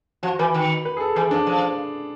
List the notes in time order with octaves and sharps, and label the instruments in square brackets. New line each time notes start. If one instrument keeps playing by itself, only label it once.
[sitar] F3 [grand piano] F#4
[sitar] E3 [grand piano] B4
[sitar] D#3
[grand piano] B4
G#4
A4
[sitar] E3 [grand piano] G#4
[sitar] F3 [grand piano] D4
[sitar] F3